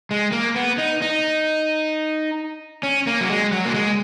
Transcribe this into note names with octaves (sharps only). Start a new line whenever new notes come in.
G#3
A#3
B3
D#4
D#4
C#4
A#3
F#3
G#3
F#3
A#3
G#3